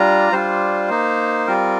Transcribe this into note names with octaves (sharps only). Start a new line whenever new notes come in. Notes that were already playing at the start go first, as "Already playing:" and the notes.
Already playing: G3 D4 F4 A#5
G3 D4 F4 C5
A#3 D#4
G3 C4 F4 A#4